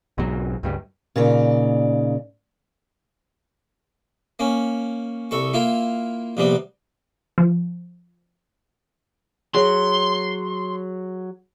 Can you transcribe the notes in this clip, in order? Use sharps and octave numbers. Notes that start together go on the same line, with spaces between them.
B1 G#2 F#3
C#2 G2 G3
A#2 C#3 D#4 D5
A#3 C#4
C2 A4 C#6
A#3 E4 F4
A#1 C3 G3 B3
F3
F#3 G#4 C#5 C6